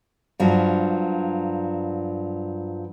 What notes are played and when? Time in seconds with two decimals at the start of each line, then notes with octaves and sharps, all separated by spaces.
0.40 G2 F3 F#3